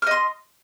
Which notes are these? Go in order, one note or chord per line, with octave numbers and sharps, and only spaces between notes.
D#5 C6 F6